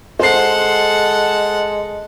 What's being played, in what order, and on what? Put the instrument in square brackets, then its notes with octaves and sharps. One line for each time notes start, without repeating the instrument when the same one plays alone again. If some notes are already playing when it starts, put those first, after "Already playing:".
[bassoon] G#3 [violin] A4 F#5 [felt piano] C5 C7